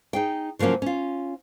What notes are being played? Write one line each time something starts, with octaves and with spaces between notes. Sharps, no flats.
D#4 G#4 G5
C#3 F3 F#3 A#3 C#4
C#4 F4